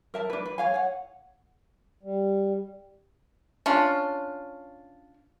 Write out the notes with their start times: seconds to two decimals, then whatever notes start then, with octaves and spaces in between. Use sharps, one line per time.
0.14 A#4 E5 A5
0.30 D4 B4
0.46 B4
0.58 C#5 F5 G#5
0.74 C#5 F#5
2.03 G3
3.66 C#4 D4 F4